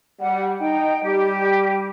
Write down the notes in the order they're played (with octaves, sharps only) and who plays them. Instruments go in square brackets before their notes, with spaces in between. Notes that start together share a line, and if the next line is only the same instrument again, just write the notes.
[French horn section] G3 [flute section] F#5
[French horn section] D#4 [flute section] G5
[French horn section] G3 [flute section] G4